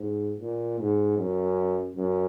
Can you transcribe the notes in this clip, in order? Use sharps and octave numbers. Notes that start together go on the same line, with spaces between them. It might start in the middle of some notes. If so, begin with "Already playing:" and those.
Already playing: G#2
A#2
G#2
F#2
F#2